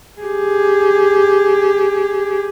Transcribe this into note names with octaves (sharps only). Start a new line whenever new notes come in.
G4 G#4